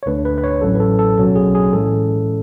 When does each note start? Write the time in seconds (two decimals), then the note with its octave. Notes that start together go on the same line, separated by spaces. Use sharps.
0.03 C#5
0.06 D2 D3 A3 D4 B4
0.25 B4
0.38 B4
0.44 C#5
0.62 A1 A2 F#3 C#4 A4
0.75 B4
0.80 A4
0.99 A4
1.17 B1 B2 F#3 C#4 A4
1.36 G#4
1.55 G#4
1.73 A2 E3 G#3 C#4 A4